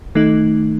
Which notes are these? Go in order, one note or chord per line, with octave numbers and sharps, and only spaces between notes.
D#3 A3 D#4